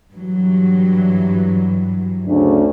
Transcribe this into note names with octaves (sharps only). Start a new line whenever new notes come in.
G2 E3 F#3
D2 C#3 D4